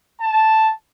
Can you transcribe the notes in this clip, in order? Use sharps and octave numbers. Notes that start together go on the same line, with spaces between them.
A5